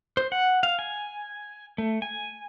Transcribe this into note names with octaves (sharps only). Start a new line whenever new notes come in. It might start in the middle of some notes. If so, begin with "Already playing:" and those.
C5
F#5
F5
G#5
A3
G#5